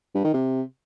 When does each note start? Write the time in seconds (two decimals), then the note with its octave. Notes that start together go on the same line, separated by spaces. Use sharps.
0.15 G2
0.24 D#3
0.34 C3